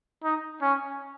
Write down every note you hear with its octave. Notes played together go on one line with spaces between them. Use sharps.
D#4
C#4